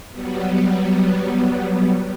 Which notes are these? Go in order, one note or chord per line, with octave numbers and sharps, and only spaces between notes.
F#3 G3 B3